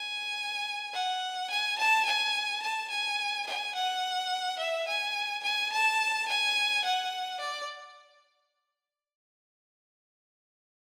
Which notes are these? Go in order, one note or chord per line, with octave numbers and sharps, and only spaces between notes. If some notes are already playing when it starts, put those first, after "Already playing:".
Already playing: G#5
F#5
G#5
A5
G#5
A5
G#5
G#5
F#5
E5
G#5
G#5
A5
G#5
F#5
D5